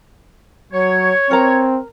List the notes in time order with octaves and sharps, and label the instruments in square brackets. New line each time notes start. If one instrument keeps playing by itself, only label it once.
[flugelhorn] F#3 [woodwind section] C#5
[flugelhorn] C4 [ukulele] A#4 A#5